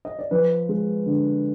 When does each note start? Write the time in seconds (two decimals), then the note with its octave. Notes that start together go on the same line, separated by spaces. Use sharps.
0.05 D#5
0.19 D5
0.31 F3 B4
0.69 G#3
1.06 D3